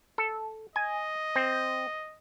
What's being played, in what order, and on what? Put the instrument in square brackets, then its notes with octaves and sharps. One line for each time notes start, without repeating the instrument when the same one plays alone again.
[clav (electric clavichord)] A4
[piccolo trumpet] D#5 [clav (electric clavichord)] G#5
[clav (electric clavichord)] C4